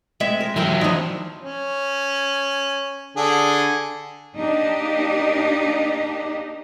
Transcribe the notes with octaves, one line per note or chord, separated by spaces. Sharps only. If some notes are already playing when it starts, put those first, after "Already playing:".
G#3 C4 E5
A#4
E3 F#3 E4 A#4 G5
F3 C4 D4 D#4
C#4
D3 G#4 A4
A#3 D4 D#4 G4